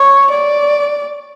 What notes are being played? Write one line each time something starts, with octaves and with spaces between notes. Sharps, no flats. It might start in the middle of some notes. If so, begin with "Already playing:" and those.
Already playing: C#5
D5